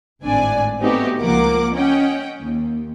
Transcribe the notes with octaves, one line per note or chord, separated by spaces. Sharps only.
G#1 A2 C4 D4 D5 G#5
A3 B3 C4 D#4 F#4 G4
C#2 F3 A#3 A#4 F#5 D6
C#4 D#5 F#5 G5
D#2